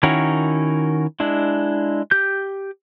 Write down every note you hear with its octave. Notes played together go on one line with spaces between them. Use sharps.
D#3 C#4 E4 F#4 A#4
G#3 D4 E4
G4 G6